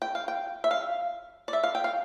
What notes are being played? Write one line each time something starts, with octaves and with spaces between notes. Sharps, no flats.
G5
F5
G5
E5
F5
D5
E5
F5
G5
F5